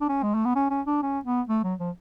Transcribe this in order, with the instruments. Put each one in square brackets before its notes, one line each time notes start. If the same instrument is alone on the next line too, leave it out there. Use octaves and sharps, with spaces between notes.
[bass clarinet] D4
C#4
G#3
A3
B3
C#4
C#4
D4
C#4
B3
A3
F#3
F3